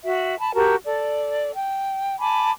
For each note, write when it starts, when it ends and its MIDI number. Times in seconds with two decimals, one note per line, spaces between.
0.05 0.39 66
0.05 0.39 76
0.40 0.53 81
0.40 0.53 83
0.54 0.75 66
0.54 0.75 67
0.54 0.75 70
0.54 0.75 81
0.85 1.52 69
0.85 1.52 74
1.55 2.17 79
2.20 2.50 80
2.20 2.50 81
2.20 2.50 83
2.20 2.50 86